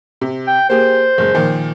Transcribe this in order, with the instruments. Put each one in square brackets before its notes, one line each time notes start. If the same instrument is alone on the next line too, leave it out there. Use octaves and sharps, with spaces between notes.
[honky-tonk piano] C3
[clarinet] G5
[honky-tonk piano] A#3 G4 G#4 [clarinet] C5
[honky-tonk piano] F#1 G#3
A#2 D#3 F3